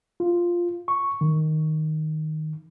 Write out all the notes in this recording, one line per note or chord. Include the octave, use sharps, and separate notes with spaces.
F4
C#6
D#3